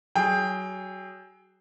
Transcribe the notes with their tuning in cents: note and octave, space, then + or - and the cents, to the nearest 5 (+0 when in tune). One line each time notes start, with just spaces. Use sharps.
F#3 +30 G#4 +10 G5 +20